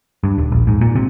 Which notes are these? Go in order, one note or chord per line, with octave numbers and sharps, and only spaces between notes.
G2
D#1
A#1
G#2
A#2
C3